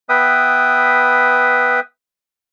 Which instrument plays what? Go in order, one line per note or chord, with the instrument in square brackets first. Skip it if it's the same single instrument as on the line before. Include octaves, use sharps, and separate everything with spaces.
[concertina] B3 B4 E5 G5 D#6